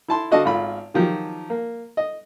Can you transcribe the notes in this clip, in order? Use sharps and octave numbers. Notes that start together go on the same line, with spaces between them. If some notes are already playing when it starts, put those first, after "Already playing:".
E4 A5 C6
D3 F#4 D#5 F5 A5
G#1 F4 B5
D#3 F3 F#3 G4
A#3
D#5